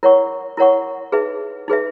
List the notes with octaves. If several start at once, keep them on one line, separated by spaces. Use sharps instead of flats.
E4 A#4 C#5 F#5 C#6
E4 A#4 C#5 F#5 C#6
D#4 G#4 B4 E5
D#4 G#4 B4 E5